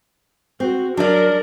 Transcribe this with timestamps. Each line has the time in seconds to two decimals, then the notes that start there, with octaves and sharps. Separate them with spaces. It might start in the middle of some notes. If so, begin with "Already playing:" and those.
0.60 C4 F#4
0.97 F#3 D4 A#4 D5